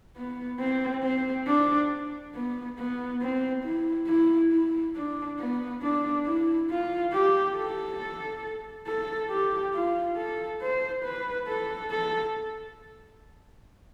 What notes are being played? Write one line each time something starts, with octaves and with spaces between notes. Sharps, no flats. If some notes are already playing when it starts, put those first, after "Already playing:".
B3
C4
C4
D4
B3
B3
C4
E4
E4
E4
D4
B3
D4
E4
F4
G4
A4
A4
G4
F4
A4
C5
B4
A4
A4